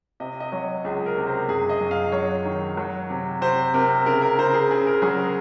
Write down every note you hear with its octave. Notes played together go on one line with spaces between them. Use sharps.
C3 D#5
D#5
F#3 C#5
C#2 G#4
A#4
C3
C5
F#2 G#4
D#5
F#2
F5
F#3 C#5
D#3
F#3
C3
C3 C5
C3 A#4
C#3 A#4
A#4
C#3 C5
G#4
C#3 G#4
A#4
F#3 G#4
A#4